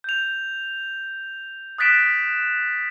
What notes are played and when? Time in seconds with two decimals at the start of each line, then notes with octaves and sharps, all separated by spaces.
0.04 G6 F7
1.78 D#6 F#6 A6 B6 D7 E7